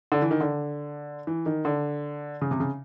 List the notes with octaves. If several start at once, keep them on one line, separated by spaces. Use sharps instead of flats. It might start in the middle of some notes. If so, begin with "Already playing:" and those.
D3
E3
D#3
D3
E3
D#3
D3
C#3
C3
C#3